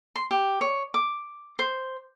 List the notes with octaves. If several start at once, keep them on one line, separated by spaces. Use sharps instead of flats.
C6
G4
C#5
D6
C5